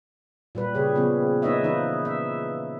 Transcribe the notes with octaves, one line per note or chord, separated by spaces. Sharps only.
A#2 G3 B4
C#3 G4 G#4 C#5
C#3 F3 B3 C#4
A#3 D#4 B4 C#5 D#5 E5
E3 D#4 B4
E5